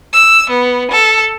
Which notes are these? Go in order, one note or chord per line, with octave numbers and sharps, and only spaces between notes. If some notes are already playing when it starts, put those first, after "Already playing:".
E6
B3
A4